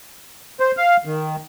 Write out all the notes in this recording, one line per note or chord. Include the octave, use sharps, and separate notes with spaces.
C5
F5
D#3